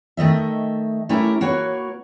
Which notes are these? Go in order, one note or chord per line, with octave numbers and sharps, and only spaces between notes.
D#3 A3 D#5 E5
A3 C#4 E4 G4 A#4
A#3 F#4 B4 C#5